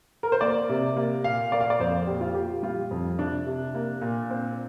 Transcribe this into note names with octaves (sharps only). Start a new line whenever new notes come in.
A#4
C5
A#3 D5
C3
A#3
A#2 F5
A#3 D5
F5
D5
F2 C5
A#2 G4
F4
A#2 G4
G3 F4
F2
C3 D4
C3
A#3
A#2
C4